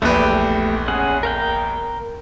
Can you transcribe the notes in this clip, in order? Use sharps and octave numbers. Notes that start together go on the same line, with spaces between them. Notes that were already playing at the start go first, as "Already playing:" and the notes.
A#1 E2 A3 G4 B4
C#4 G#4 F#5
A#4 F5 G5